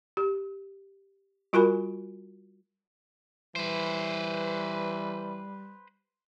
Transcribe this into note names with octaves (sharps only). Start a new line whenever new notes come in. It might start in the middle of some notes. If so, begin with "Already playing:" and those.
G4
G3 F4 F#4 A#4 G#5 B5
E3 G3 B4 C5